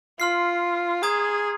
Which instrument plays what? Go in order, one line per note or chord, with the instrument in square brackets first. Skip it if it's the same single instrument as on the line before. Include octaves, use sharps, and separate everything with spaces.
[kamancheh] F4 [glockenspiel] C6 F6 C7
[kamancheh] G#4 [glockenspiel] A#5 D#6 G#6